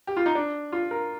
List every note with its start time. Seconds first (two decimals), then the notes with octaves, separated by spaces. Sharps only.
0.07 G4
0.17 F4
0.26 D#4
0.35 D4
0.72 F4
0.91 A#4